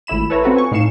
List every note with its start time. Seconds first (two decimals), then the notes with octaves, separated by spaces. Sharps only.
0.07 G#1 A3 E4 B5 E7
0.30 A4 B4 C#5 E5 A#5
0.43 C4 F4 F#4 A4 B4
0.56 G#5 C#6
0.71 A2 D#4 F5 C7 C#7 E7